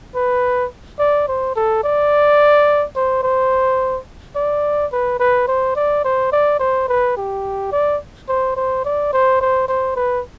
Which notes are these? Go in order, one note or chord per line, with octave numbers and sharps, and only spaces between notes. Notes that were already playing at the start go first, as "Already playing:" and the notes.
B4
D5
C5
A4
D5
C5
C5
D5
B4
B4
C5
D5
C5
D5
C5
B4
G4
D5
C5
C5
D5
C5
C5
C5
B4